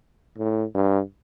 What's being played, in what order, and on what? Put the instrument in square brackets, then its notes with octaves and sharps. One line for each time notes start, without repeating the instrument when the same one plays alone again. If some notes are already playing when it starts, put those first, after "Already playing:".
[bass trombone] A2
G2